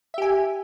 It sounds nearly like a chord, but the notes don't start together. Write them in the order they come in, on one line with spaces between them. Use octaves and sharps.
E5 G4 G#5